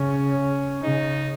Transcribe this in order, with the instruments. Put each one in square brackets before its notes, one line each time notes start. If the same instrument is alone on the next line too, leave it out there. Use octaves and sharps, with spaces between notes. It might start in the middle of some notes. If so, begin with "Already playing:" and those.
Already playing: [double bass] C#3 [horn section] C#4
[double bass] C#3 [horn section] D#4